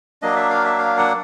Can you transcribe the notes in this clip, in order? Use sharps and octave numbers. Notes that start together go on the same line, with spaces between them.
F#3 A#3 D4 D#5
E5
F5
E5
F5
F#5